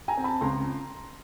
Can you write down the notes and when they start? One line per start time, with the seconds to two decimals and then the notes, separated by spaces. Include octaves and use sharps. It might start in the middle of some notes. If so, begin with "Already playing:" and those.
0.08 G#5 A#5
0.17 C4
0.24 A5 B5
0.41 C#2 A#5 C6